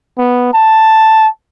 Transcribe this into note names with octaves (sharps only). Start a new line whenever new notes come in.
B3
A5